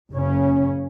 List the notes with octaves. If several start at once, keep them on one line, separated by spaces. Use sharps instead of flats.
F#1 C#3 C#4